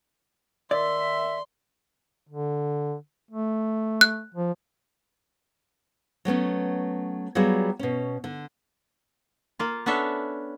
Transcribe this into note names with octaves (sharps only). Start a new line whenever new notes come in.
D#3 D5 E5 C6
D3
A3
F#6
F3
F#3 A3 B3 C#4
F#3 G3 B3 F4 F#4 G#4
B2 C#4
D3
A#3 F4
B3 C#4 D4 A4 C#5 E5